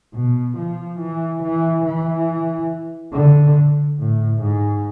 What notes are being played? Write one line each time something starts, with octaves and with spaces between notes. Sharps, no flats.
B2
F3
E3
E3
E3
D3
A2
G#2